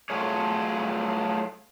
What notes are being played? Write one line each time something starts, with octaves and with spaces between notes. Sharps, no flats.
F#3 A3 F4 G#4 C#5